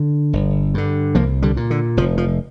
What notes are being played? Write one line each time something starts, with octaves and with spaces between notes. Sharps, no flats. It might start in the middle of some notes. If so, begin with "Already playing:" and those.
Already playing: D3
G1
G2 D3
C2 F3 A#3
D3 G3
A#2
D3
F1 F3
F3